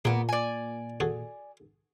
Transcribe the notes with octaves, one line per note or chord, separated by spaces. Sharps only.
A#2 A#3 B3 G#4
D5 G#5
F#4 G#4 A4